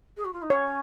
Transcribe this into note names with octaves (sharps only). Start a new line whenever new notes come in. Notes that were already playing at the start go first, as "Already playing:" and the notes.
G#4
F#4
F4
D#4
C#4 C#5